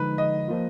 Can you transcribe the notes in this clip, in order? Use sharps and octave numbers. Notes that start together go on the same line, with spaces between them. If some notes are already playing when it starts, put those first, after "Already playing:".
Already playing: D3 F3 G#3 D#4 B4
D#5
F3 A#3 F4